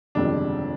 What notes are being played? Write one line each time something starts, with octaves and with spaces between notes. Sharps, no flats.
G1 F2 C3 D#3 G#3 D4